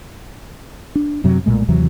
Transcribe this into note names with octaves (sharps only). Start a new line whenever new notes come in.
D4
F#2 C3 F#3
B1 A#2 G#3 A3
D#2 C3 E3 F#3